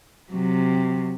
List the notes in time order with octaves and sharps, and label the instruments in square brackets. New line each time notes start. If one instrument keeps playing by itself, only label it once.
[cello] C3 F#3